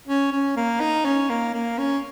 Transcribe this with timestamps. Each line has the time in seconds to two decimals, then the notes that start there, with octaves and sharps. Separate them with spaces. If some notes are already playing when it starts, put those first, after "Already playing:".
0.08 C#4
0.32 C#4
0.56 A#3
0.80 D#4
1.05 C#4
1.29 A#3
1.54 A#3
1.78 C#4